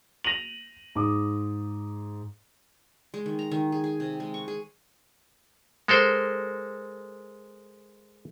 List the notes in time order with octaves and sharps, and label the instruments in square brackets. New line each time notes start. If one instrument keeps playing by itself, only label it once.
[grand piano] A#6 D#7 F7 F#7
G#2 D6 D#6
[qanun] G#3
D#3
A#5
D#3
G#4
G#4
C3
G#3
C#6
G#4
[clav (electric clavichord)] G#3 A4 A#4 C5